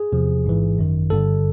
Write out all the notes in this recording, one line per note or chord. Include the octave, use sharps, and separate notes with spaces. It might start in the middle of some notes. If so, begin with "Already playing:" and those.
Already playing: G#4
E2 C3 F3
A1 G#2 E3
G#1 F#2 D#3
G1 G2 D3 A4